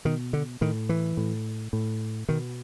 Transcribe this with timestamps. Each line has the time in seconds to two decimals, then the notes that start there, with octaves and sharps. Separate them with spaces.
0.05 B2 D#3
0.33 D3
0.61 A2 D#3
0.89 E3
1.17 A2
1.73 A2
2.29 B2 D#3